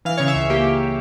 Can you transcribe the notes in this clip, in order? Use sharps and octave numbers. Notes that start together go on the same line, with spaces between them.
E3 F5
C#3 C#5
E5
C#2
A#3 G4